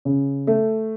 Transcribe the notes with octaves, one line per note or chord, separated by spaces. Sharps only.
C#3
A3